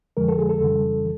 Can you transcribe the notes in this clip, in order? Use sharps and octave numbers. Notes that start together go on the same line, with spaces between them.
F2 D3 F3 G#3 A#4
A4
G#4
A4
F2 C#3 E3 G3